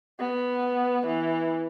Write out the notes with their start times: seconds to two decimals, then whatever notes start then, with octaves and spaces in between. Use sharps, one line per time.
0.20 B3
1.07 E3